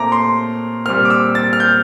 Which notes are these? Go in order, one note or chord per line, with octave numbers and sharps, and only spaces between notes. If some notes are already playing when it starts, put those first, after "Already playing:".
Already playing: A#2 A3 C4 A#5 D6
C6
A#2 G3 C4 F6
D6
E6
A6
F6
G6